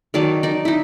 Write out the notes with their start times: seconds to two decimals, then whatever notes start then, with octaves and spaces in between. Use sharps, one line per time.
0.14 D#3 F#3 D5 A5
0.43 D#4 D5
0.65 D#4 E4